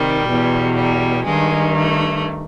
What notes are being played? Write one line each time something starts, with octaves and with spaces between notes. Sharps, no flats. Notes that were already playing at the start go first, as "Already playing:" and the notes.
Already playing: C3 D#3 G3
E2 B2
G3
G2 D#3 G#3
A3